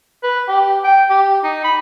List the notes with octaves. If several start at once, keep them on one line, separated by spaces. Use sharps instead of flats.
B4
G4
G5
G4
D#4
B5